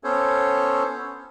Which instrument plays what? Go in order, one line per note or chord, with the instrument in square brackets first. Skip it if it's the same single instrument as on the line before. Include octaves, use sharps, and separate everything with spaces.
[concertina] B3 C#4 A4 C5 C#5